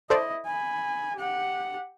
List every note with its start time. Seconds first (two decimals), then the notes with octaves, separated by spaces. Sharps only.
0.10 E4 A4 C5 D5 D#5
0.46 G#5 B5
1.16 G4 F#5